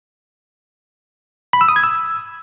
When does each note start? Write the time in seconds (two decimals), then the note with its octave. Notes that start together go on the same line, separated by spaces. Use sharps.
1.53 B5
1.61 E6
1.68 D#6
1.76 G#6
1.84 E6